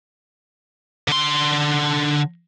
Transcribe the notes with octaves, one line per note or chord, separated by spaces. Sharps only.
D3 C6